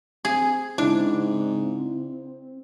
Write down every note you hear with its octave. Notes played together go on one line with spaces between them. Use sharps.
C4 G#4
G#2 C#3 D4 E4